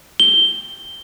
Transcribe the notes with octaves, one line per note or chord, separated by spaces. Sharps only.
G7